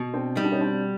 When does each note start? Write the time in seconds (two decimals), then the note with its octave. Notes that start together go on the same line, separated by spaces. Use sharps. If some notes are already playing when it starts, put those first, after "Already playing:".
Already playing: B2
0.14 C4 D4
0.37 G3 D#4
0.44 D4
0.52 C#4 D#4
0.61 C4 D4